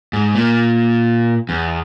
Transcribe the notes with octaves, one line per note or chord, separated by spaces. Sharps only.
G#2
A#2
E2